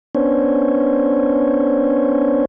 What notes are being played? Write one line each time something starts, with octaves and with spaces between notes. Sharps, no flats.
B3 C#4 D4 C5 C#5